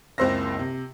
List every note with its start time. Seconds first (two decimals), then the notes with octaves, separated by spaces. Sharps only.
0.18 F#1 C#2 C4 C5 E6 A#6
0.59 C3